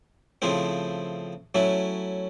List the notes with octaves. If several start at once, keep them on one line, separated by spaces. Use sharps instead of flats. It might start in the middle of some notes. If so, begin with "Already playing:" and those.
C#3 F3 A3 C4 E4
F#3 A3 C#4 E4